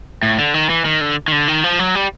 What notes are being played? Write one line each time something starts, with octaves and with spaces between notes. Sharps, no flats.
A2
D3
D#3
E3
D#3
D3
D#3
D3
D#3
F3
F#3
G3